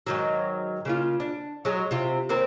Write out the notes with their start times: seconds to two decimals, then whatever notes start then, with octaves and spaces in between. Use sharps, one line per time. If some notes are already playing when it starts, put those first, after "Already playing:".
0.07 G#2 D#3 F#3
0.85 C#3 A#3 F4
1.20 D4
1.65 F#3 G#3
1.91 C3 F4
2.29 D#2 C4 A#4